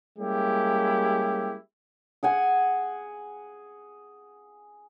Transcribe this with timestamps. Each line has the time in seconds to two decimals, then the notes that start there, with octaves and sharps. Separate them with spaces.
0.17 G3 G#3 A#3 C#4 E4 G4
2.23 G#4 F#5 G#5